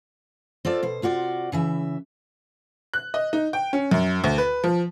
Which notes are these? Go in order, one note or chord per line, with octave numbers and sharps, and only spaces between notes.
C4 F4 A4 D5
B2 C5
C3 F4 F#4 C#5 D5
C#3 E3 E5
F#6
D#5
D#4
G5
C#4
F#2
D2
B4
F3